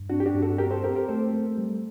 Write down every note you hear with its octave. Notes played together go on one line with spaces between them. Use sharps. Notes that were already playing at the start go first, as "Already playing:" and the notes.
Already playing: G2
C4 D4 F#4
G4
D4 F#4
G2
F#4 A4
C4 G4 A#4
A4 C5
C4 G4 A#4
G4 A#4
A3 A4 C5
A3
G3